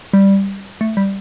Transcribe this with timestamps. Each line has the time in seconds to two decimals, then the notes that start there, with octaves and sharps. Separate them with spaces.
0.14 G3
0.81 A3
0.97 G3